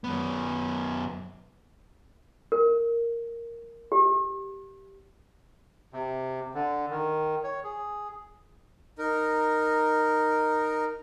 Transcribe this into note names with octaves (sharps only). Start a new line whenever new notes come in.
F#2 B3
A#4
G4
C3
D3
D#3
C#5
G#4
D#4 A#4